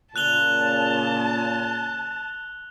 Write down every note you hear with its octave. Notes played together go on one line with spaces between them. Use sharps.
A#2 C#3 A5 F#6 F7 G7